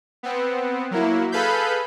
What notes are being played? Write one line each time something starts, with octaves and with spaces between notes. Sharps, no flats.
B3 C4
F#3 A#3 E4
G#4 A4 B4 F5 B5 G6